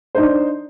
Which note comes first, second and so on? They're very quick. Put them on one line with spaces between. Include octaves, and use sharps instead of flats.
C5 D#4 D4